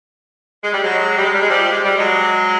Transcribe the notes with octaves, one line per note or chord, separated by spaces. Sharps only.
G#3
G3
F#3 G#3
G3
G#3
G3
G#3
F3 G3
G#3
G3
F#3 G#3